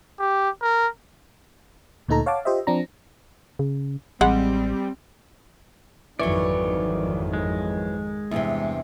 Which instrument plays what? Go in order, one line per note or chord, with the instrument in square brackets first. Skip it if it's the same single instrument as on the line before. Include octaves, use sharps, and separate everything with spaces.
[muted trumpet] G4
A#4
[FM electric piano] D2 A#2 A3 D#4 A4 A#5
C#5 F5 F#5 A5 D6
F4 G4 C5 D#5 E5
F3 C4 D4 A#5
[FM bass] C#3
[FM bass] A1 [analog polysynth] G3 [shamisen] G#3 F#5 [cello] C4
[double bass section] G#1 F2 D#3 [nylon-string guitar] E3 F#3 [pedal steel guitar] D5 C#6
[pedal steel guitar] G#3
[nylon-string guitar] E2 G2 C3